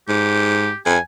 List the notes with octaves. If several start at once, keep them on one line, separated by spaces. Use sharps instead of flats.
G#2 G4
F2 G#5